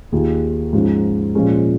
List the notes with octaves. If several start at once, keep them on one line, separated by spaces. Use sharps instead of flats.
D#2 D#3 A#3 F4 G#4
G#2 F3 G#3 C#4 F4
A#2 F3 G#3 C#4